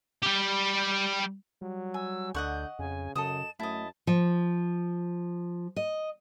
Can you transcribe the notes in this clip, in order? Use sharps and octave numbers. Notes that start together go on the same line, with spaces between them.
G3 G4
F#3 G3
G#5 E6
D2 D3 D#5 F#5 C#6 G6
F2 C#3 G#5
F#2 C#3 A4 D#5 D#6 E7
F#2 A3 E4 D#5 A5
F3
D#5